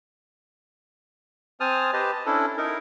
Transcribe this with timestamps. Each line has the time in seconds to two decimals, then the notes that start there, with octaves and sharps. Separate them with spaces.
1.60 C4 C5 G#5 A5 D#6 F6
1.93 G4 B4 C5 D#5 A5
2.13 A5
2.26 C#4 D4 E4 A4
2.58 D#4 E4 A#4